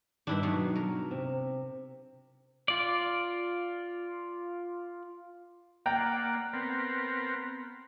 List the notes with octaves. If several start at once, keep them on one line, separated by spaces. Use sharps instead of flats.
G2 D#3 D4 E4 E5
B2 D#3 F#3 A5
A#4
C3
F4 D5
A#3 D5 F#5 G5 A#5
B3 C4 A#4